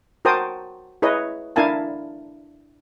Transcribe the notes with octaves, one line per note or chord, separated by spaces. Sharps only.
F#4 A#4 C5 G5 A5 D#6
E4 G#4 B4 C#5 D#5
D4 E4 A#4 F5 G#5 A5